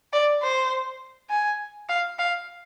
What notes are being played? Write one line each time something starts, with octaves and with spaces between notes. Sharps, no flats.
D5
C5
G#5
F5
F5